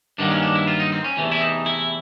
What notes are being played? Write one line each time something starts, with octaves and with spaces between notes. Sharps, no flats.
G2 D#3 F#3 A#3 D4
C#4
D4
E4
F4
D#4
C4
C#4
E2 C3 E3 A3
E4
D#4
E4